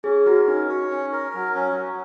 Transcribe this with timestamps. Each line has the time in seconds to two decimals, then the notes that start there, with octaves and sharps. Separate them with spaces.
0.04 C#4 G#4
0.26 F#4 A#4
0.48 C#4 D#4
0.69 C#5
0.91 C#4
1.12 A#4
1.34 F#3
1.55 C#4
1.77 F#3